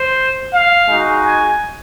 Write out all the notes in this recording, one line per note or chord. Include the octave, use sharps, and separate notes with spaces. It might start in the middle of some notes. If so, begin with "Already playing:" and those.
Already playing: C5
F5
G#3 D#4 F#4
G#5